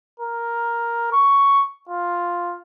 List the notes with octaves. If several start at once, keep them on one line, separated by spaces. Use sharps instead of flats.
A#4
C#6
F4